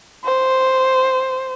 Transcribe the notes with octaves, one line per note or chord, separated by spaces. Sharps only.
C5